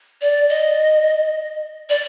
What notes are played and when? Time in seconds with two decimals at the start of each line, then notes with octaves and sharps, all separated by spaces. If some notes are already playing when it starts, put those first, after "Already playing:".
0.21 D5
0.49 D#5
1.89 D5